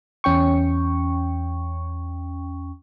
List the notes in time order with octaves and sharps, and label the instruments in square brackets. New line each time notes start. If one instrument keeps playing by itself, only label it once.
[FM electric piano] E2 C#4 G5 C#6